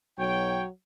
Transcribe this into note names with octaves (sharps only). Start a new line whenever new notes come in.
B1 F#3 C#5 G5